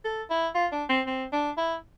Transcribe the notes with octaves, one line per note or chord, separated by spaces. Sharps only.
A4
E4
F4
D4
C4
C4
D4
E4